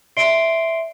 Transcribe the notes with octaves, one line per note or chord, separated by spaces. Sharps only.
D5 E5 C6 C7 D7 G7